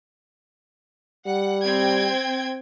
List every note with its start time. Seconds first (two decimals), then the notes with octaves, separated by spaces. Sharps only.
1.26 G3 F#5
1.64 C4 G5 G#6